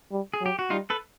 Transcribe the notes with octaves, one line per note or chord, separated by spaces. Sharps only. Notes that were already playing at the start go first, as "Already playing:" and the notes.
G3
G#4
F#3
G4
F#4
G3 D#4 F4
A4 B4